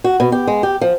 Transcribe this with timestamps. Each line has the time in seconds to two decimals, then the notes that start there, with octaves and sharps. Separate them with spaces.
0.04 F#4
0.20 B2
0.32 G4
0.47 G#3
0.63 G4
0.81 F3